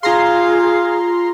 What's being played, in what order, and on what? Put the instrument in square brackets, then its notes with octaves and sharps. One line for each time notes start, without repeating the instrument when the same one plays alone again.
[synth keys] F4 A#5 C6 [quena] G#4 [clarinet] F5